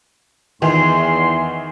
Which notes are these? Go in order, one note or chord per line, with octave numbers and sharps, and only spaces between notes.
E2 D#3 E3 C6